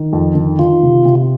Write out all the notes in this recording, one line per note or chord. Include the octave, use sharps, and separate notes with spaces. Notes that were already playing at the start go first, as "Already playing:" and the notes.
Already playing: D#3
F2
D#3
D#3 F4
C3
C3